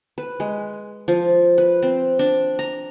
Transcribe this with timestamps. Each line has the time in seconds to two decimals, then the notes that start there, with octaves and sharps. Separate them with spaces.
0.18 B4
0.40 G#3
1.08 F3
1.58 B4
1.82 C4
2.19 D4
2.59 A#5